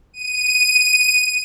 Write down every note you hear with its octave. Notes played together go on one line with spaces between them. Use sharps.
D#7